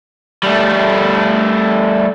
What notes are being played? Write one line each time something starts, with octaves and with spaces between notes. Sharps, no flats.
G3 A3